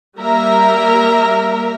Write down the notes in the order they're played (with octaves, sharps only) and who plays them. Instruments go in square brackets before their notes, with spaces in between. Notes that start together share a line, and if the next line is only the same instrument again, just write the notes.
[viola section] G3 A#3 A#4 E5 A#5